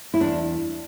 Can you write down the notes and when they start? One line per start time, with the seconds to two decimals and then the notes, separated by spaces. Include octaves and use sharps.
0.14 E4
0.20 E2 D4